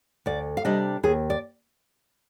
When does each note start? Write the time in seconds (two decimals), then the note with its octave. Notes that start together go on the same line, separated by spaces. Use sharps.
0.26 D2 D5
0.57 F5
0.65 C3 G3 D4 D#5
1.03 D#2 G#4
1.30 D5